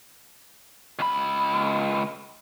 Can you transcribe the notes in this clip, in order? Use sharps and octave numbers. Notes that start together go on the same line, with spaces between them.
C#2 B5